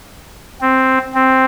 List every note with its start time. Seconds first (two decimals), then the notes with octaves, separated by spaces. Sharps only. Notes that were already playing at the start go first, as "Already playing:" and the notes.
0.61 C4
1.15 C4